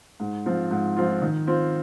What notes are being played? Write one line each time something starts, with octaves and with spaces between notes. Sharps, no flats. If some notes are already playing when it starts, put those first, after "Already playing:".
G#2
F3 C4 F4
G#2
F3 C4 F4
D#3
C4 F4